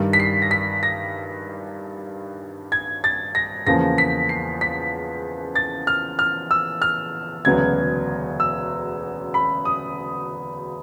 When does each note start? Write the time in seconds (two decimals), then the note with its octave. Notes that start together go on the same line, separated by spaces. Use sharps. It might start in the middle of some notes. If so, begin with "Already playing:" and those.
Already playing: G2 D#3 G3
0.13 B6
0.20 C7
0.42 A#6
0.51 B6
0.83 A#6
2.72 G#6
3.04 A6
3.35 A#6
3.66 E2 C#3 F3 A#3 A#6
3.98 B6
4.29 C7
4.61 B6
5.55 A6
5.87 F6
6.19 F6
6.51 E6
6.82 F6
7.45 E1 D2 C#3 F#3 B3 G#6
8.40 E6
9.34 B5
9.65 D#6